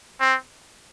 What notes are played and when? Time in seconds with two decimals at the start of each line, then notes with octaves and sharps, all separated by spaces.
0.20 C4